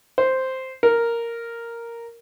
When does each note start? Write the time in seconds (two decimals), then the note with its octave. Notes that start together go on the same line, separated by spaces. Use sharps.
0.18 C5
0.83 A#4